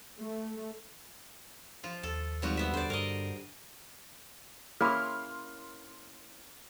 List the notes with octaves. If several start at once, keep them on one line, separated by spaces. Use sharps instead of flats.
A3
F3 F4
D#2 A4
G#1 F3 G3 F#4
B3 E5
D#2 D3 C5 D5
G2 A#4 D5 D#5
A#3 C#4 E4 G#4 B5 C6 F6